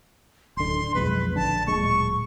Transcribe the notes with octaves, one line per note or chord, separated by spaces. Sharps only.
D1 D3 C6
B1 F2 G#3 B4
A#1 D3 A5
D1 A#2 G#3 C#6